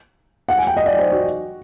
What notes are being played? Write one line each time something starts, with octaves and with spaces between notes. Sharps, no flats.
F#5
G#5
G5
D#5
D5
C5
F#4